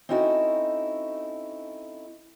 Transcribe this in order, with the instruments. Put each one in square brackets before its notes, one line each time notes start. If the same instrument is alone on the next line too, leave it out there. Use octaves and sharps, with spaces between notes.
[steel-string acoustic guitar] C4 C#4 D#4 E4 F#4 A4